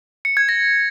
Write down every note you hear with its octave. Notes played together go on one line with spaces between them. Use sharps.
C#7
G#6
A#6